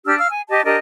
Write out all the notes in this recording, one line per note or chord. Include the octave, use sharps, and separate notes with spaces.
D4 G4 E6 F6
F5 E6 F6
G#5
G4 D#5 A5
D4 G4 A#4 D#5